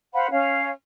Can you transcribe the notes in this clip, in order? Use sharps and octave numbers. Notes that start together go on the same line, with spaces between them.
C5 F5 F#5 B5
C#4 F5